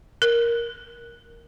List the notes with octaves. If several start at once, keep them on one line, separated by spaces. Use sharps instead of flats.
A#4